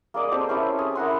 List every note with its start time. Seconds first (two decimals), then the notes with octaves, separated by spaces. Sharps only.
0.14 A#3 G#4 D5 D#5
0.32 C4 G4 A4 C5
0.49 C#4 E4 G4 A4
0.79 G#4
0.95 E4 A#4 F#5 C6